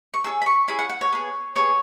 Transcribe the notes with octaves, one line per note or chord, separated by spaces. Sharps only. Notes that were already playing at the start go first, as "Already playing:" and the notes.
C#6
C#4 E4 G#4 E6
B5
C#6
C#4 E4 G#4 B5
F#5
F#5
C#5
B3 G#4
B3 G#4 C#5